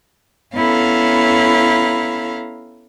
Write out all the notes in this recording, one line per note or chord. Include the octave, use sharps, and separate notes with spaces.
B3 C#4 E4 A4 F5 A#5